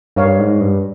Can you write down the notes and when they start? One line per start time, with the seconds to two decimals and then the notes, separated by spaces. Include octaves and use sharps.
0.16 G2 A#4 C#5 F5
0.39 G#2
0.60 G2